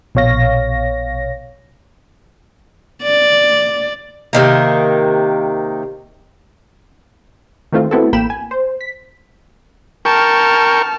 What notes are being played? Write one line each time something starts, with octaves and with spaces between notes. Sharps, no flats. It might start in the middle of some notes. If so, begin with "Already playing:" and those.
A#1 B2 C#5 F5 A#6
D5
C3 D#3 A#3
D#3 E3 A3 C4 F4
A3 B3 C4 E4 F#4 A4
A1 A#3 G5 B5 E7
G#5
C5
B6
A#4 G5 A5 C#6 F6